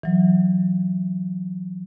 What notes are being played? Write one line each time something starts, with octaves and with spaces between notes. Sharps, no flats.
E3 F#3